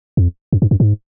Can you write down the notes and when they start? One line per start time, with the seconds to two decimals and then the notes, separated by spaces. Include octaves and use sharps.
0.17 F2
0.53 F#2
0.62 G2
0.71 F#2
0.80 G#2